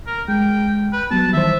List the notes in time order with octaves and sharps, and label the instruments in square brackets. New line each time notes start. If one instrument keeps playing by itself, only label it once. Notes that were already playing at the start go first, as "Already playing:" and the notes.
[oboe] A#4
[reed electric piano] G#3 [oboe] G5
[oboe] B4
[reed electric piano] F#3 G3 B3 [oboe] A5
[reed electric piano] D#3 E3 C5 [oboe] E5